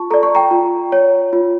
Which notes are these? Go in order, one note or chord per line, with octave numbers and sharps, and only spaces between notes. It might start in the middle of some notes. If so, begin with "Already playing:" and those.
Already playing: F4 A5 C#6
A4 D5 A#5
C#6
G5 A#5
F4
C#5
F4